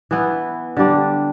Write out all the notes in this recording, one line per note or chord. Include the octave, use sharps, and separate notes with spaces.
E3 B3 E4
D3 G3 D4